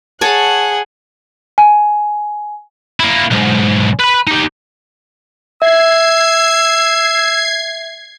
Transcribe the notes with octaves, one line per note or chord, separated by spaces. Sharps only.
G#4 C#5 F#5 G#5 A5
G#5
A#3 E4
B1 G#2
B4 B5
D#4 G4
E5 E6 G#6 C7